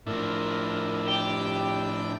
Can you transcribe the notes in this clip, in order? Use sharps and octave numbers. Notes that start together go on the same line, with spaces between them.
A2 F3 D4 E4 A#4
G4 G5